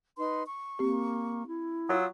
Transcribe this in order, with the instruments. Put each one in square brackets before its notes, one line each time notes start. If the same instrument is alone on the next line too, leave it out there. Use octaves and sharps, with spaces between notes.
[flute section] D#4 B4 C6
C#6
[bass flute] A#3 [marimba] C4 G4
[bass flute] E4
[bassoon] F#3 [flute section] F4 D#6 E6